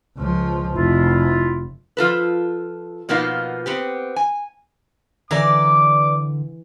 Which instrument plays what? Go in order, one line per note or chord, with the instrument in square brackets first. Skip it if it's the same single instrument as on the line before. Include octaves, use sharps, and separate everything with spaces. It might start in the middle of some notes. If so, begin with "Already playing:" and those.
[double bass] C#2 F3
[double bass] F1 [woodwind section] E4 F4
[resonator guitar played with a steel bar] F3 F4 A4 B4
B2 F3 A#3 B3 D#4 F4
B3 C4 G4
G#5
[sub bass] D3 [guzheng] E3 A#5 [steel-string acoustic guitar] B4 D5 [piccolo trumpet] D6